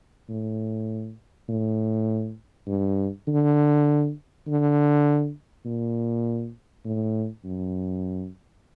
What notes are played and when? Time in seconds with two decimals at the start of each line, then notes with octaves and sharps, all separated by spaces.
0.29 A2
1.49 A2
2.67 G2
3.27 D3
4.47 D3
5.65 A#2
6.85 A2
7.44 F#2